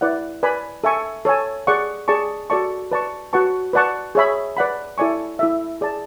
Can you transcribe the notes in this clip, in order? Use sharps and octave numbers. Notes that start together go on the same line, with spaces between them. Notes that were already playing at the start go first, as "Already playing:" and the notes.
E4 B4 D5 F#5
B4 D5 G#5 B5
A4 E5 G#5 C#6
A4 C#5 G#5
G#4 D5 F#5 C#6
G#4 D5 A5 C#6
F#4 A4 D5 A5 C#6
B4 D5 A5 C#6
F#4 B4 F#5 A5 C#6
B4 D5 F#5 A5 C#6
G#4 C#5 E5 B5
B4 D5 F#5 B5
E4 A4 D5 G#5 C#6
E4 A4 E5
G#4 D5 A5